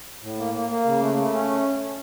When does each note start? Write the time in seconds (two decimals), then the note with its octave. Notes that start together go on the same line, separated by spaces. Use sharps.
0.22 A2
0.38 A#3
0.54 A#3
0.70 A#3
0.85 C#3
1.01 A3
1.17 A3
1.32 C#4